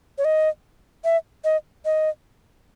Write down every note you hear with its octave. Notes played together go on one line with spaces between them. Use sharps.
C#5
D#5
E5
D#5
D#5